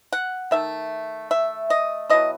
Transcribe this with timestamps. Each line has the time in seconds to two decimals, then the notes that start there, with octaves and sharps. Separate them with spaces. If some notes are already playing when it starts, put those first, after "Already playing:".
0.13 F#5
0.51 D#3 A3 E5
1.31 E5
1.70 D#5
2.09 B2 F#3 C#4 E4 D#5